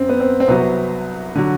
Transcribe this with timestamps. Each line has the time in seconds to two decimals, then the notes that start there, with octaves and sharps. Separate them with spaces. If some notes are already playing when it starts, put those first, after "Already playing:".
Already playing: F#2 C4
0.09 B3
0.20 C4
0.40 C4
0.48 C2 C3 F#3 B3
1.35 D3 F#3